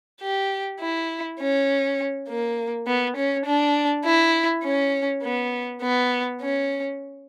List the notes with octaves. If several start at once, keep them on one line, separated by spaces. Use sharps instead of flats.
G4
E4
C#4
A#3
B3
C#4
D4
E4
C#4
B3
B3
C#4